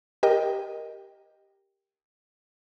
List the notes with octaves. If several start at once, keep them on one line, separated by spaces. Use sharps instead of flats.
G4 A#4 D#5 G5